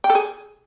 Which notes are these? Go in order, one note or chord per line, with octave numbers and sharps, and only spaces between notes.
G5
A4
G#4